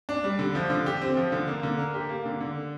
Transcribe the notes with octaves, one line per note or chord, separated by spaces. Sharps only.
D4
G3
D3
F3
D3
G4
C4
F3
D3
A#3
D3
A#4
G4
A#3
D3
D3